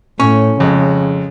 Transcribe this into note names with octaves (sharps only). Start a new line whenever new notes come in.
A2 C#4 C#6
F2 C#3 G#3